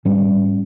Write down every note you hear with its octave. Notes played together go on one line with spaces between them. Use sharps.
G#2 G3 C#4